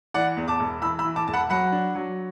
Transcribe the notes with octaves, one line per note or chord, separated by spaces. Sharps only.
E3 D5 F#5
E2
A5 D6
E1
E3 B5 E6
B5 E6
E3
A5 D6
E1 A5
F#5 B5
F#3 F#5 B5
D4
F#3